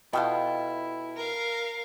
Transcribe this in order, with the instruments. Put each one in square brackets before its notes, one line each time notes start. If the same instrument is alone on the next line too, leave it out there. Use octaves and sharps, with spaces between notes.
[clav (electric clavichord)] B2 [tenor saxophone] E4 [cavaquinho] F4 A4 G5
[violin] A#4 F5